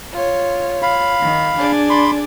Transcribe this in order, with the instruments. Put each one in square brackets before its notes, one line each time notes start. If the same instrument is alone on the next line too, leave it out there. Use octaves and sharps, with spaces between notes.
[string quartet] F4 C#5
[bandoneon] F5 B5
[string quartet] D#3
D4 G#4 D5
[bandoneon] B5 C6